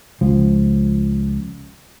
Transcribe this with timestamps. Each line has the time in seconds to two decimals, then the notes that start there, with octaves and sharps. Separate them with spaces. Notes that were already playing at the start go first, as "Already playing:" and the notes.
0.21 C#2 F3